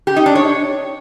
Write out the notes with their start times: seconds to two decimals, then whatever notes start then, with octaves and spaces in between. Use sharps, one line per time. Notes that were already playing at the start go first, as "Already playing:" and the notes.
0.07 G4
0.16 D#4
0.26 D4
0.35 C#5